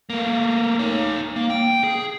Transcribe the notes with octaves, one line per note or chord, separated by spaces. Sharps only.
A3 A#3
D#4 C#5
A#3
G5
G#4